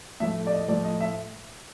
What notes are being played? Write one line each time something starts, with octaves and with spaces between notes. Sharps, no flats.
A2 F3 A3 E5
D5
D#5
A2 F3 A3 D5
D#5
E5